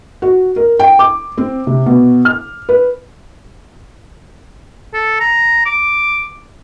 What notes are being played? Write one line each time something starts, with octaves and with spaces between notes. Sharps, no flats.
F#4
A#4
G5
D6
C4
C3
B2
F6
B4
A4
A#5
D6